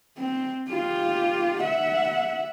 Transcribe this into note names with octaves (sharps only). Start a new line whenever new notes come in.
C4
F4 G4
E5 F#5